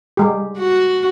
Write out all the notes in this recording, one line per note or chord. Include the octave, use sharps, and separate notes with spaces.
G3 G#3 G4
F#4